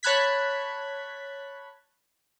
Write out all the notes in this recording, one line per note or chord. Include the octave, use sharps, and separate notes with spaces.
C#5 A5 B5 F#6 G#6 B6